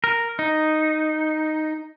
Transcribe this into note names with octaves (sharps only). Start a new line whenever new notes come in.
A#4
D#4